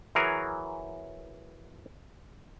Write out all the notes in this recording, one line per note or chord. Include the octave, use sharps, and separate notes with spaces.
E3 F#3 G#4 A#4 C#5